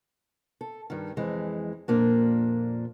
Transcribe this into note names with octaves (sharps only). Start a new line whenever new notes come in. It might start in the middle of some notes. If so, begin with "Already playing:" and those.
A4
G2 D#3
F2 E3 G#3
F2 A#2 A#3 D4